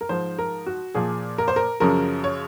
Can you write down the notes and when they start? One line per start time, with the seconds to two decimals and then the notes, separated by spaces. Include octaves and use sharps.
0.01 A#4
0.09 G#2 F3 C5
0.39 A#4
0.66 F#4
0.95 A#2 F3 G#4
1.38 A#4
1.48 C5
1.56 A#4
1.80 F#2 C#3 F3 A#4
2.24 C#5